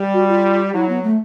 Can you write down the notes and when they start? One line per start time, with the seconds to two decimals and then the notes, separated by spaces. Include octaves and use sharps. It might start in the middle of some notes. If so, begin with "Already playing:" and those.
Already playing: G3
0.13 F#4
0.28 F4
0.74 F#3 E4
0.88 B3
1.03 A3